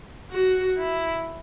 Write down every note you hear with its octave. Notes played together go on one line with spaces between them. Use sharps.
F#4
E4